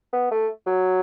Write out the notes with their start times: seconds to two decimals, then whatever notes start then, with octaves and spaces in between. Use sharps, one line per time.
0.13 B3
0.31 A3
0.66 F#3